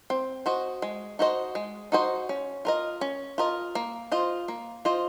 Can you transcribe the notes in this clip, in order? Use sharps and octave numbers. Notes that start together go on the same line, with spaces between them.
C4
F#4 C5 D#5
G#3
D#4 F#4 C5 D#5
G#3
D#4 F#4 C5 D#5
C#4
F4 A#4 D#5
C#4
F4 A#4 D#5
A#3
F4 C5 D#5
A#3
F4 C5 D#5